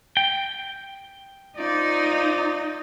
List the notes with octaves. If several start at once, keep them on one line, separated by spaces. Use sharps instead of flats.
G5
D#4 F4 C5 D5